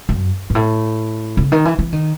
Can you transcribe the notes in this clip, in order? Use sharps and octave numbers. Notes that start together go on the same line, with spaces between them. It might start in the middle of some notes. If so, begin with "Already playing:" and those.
F#2
G#2
A2
C#3
D#3
E3
E3
D#3